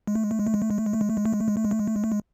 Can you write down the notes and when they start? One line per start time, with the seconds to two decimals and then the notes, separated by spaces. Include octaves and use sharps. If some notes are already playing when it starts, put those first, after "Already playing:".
0.07 G#3
0.15 A3
0.24 G#3
0.31 A3
0.39 G#3
0.47 A3
0.54 G#3
0.62 A3
0.71 G#3
0.78 A3
0.86 G#3
0.93 A3
1.01 G#3
1.10 A3
1.17 G#3
1.26 A3
1.33 G#3
1.40 A3
1.48 G#3
1.57 A3
1.64 G#3
1.71 A3
1.79 G#3
1.88 A3
1.96 G#3
2.04 A3
2.12 G#3